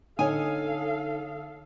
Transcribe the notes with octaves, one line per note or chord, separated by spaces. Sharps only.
D3 D#4 A4 C#5 F5 G#5 D#6